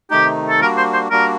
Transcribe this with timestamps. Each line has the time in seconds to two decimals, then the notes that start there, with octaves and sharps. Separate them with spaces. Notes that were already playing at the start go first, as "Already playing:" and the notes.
0.11 C3 D#3 A3 D#4 G4
0.49 A4
0.61 G3 A#3 D4 F#4 A#4
0.77 C5
0.93 C5
1.10 G3 A#3 D4 F#4 A#4